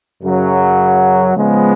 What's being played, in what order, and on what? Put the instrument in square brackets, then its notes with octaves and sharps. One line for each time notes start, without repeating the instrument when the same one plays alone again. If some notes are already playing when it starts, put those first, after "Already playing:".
[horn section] F#2 C#3 F#3
C#3 F3 G#3 B3